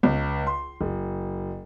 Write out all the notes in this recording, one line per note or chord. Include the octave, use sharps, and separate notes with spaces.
C#2
C6
F#1